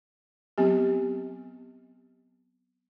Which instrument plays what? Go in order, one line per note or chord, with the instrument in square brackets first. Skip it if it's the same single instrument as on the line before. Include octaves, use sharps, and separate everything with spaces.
[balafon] F#3 B3 C4 G4